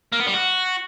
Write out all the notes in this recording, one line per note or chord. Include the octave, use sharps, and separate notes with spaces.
A#3
B3
G3
F#4